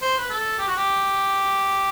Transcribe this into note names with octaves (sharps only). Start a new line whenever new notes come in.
C5
B4
A4
G4
F#4
G4